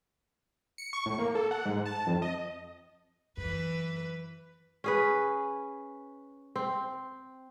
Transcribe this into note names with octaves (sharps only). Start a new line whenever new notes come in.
C#7
C#6
A2
A#3
A4
F#5
G#2
A5
F2
D#5
F#2 E3 B4
C#4 G#4 B4
C4